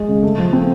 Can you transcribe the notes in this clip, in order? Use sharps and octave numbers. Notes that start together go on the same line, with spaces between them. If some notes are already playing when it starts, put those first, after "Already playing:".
Already playing: G#3
C#3
A3
F3
C4